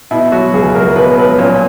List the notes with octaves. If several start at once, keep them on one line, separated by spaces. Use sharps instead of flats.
B2 E4
F#3 F#4
C#2 G#4
C#2 A#4
B2 B4
F#3 B4
A#2 C#4